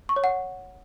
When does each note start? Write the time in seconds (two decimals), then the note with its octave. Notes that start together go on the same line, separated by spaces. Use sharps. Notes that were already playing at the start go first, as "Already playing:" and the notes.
0.09 C#6
0.16 C#5
0.24 F#5